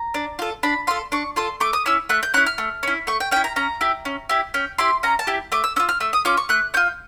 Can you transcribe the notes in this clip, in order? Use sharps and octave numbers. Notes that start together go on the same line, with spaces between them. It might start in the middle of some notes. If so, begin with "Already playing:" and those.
Already playing: A#5
D4
F4 A4
D4 B5
F4 A4 C6
D4 C#6
F4 A4 C6
A3 D6
D#6
C#4 E4 E6
A3 F#6
G6
C#4 E4 F#6
F6
A3
C#4 E4
A3 C#6
G5
C#4 E4 G5
A#5
C#4 A#5
E4 G4
C#4
E4 G4
C#4 G5
E4 G4 C6
C#4 A#5
A5
E4 G4
A3 D6
E6
C#4 F4 E6
F6
A3 E6
D#6
C#4 F4 D6
C#6
A3 F#6
C#4 F4 G6